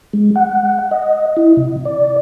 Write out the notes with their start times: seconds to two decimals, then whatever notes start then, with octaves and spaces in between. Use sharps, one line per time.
0.13 G#3
0.36 F#5
0.91 D#5
1.37 E4
1.57 C3
1.85 D5